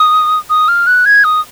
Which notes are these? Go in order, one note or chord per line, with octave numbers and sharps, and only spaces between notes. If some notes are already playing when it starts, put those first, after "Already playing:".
Already playing: D#6
D#6
F6
F#6
G#6
D#6